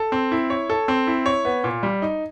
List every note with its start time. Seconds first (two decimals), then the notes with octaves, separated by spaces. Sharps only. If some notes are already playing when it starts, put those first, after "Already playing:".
Already playing: A4
0.12 C4
0.32 E4
0.50 C#5
0.70 A4
0.88 C4
1.07 E4
1.26 C#5
1.45 B3
1.64 A#2
1.83 G3
2.02 D#4